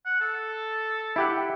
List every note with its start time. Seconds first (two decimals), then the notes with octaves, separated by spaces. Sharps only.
0.05 F#5
0.21 A4
1.16 E4 G4 F#5